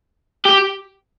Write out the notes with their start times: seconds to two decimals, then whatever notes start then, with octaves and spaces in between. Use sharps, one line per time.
0.45 G4